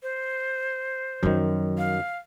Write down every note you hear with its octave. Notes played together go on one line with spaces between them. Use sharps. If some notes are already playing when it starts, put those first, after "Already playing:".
C5
F#2 D#3 F3 F#3
F5